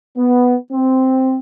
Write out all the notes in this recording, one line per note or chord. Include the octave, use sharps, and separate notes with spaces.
B3
C4